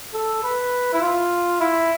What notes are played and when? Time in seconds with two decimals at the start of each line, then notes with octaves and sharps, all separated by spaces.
0.14 A4
0.43 B4
0.93 E4
1.02 F4
1.60 E4